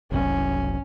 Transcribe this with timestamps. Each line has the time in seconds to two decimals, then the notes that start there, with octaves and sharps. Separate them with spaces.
0.11 F#1 C2 F#2 C#4